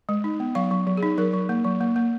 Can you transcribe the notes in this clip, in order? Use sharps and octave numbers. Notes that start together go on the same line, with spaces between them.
G#3
D#4
B3
F#3 F5
F#3
F#3
G#4
D#4
F#3 A#4
F#3
A#3
F#3
A#3
A#3